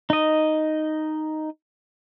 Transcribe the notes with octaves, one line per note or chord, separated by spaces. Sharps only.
D#4 D#5